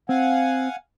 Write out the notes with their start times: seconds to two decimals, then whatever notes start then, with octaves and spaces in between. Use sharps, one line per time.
0.09 C4 F5 F#5 G#5